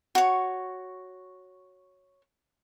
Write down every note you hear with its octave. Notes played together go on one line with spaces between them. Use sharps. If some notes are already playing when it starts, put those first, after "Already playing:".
F#4 C#5